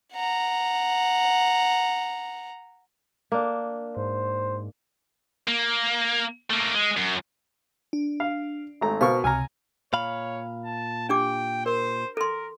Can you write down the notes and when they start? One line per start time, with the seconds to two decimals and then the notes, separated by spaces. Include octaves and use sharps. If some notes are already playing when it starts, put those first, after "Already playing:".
0.13 F#5 A#5
3.32 A#3 D4
3.97 G#2 C5
5.47 A#3
6.50 A3 A#3
6.74 G#3
6.97 F#2
7.93 D4
8.20 F5
8.81 G#1 A3 A#5
9.01 B2 A#4 C5 F5 C#6
9.24 C#2 C3 G#5 A#5 F6
9.93 A#2 C#5 F5 B5
10.65 A5
11.09 D4 G4 G5 D6
11.66 A#4 C5
12.17 A4 A#4 C6